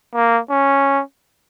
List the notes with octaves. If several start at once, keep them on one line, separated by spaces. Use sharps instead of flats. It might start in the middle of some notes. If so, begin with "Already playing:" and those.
A#3
C#4